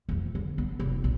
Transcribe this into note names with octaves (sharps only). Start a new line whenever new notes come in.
F2 A3
D3
B3
F1
A#1